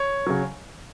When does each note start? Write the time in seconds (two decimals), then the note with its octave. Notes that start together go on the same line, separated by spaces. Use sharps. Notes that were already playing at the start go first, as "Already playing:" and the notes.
Already playing: C#5
0.26 C#3 F#3